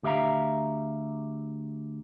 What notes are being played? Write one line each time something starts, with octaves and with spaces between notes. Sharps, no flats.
D2 G4 E5 F5 A#5